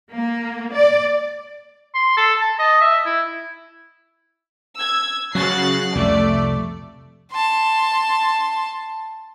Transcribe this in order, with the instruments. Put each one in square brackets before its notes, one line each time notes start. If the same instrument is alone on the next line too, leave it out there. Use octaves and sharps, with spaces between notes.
[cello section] A#3
D5
[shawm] C6
A4
A5
D#5
E5
E4
[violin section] E6 G#6
[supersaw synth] C#3 F#4 [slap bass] F#3 [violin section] F#6 A6 C7
[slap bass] C2 F2 C3 [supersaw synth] A3 [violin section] D5
[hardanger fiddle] A5 C6